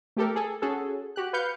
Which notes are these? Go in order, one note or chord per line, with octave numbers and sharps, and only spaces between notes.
A3 G4 A4 A#4
G#4 A4
C#4 F#4 G#4 A4
F#4 G4 F#6
B4 F5 G6 C#7